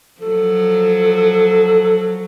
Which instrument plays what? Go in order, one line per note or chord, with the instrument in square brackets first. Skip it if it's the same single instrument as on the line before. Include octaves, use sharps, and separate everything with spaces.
[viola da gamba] F3 F#3 [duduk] A4